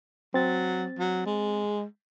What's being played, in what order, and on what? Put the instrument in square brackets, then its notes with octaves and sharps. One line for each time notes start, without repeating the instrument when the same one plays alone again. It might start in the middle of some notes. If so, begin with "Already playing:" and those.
[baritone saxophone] F#3 [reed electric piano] C4 A6
[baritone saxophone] F#3
G#3